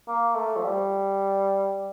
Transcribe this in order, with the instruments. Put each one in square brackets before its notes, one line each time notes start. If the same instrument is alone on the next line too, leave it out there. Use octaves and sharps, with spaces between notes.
[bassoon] A#3
A3
F3
G3